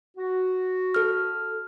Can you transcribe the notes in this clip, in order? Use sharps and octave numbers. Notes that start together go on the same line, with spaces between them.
F#4
A4 F6